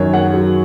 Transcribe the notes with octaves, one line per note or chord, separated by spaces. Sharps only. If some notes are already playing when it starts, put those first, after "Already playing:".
Already playing: F#2 D#3 C#5
A#3 F#5
F#3